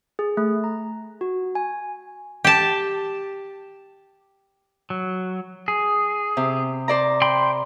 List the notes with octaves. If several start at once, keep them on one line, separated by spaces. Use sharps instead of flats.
G#4
A3
A#5
F#4
G#5
G4 A5
F#3
G#4
C3
C5 D5 A#5
G5 B5 C6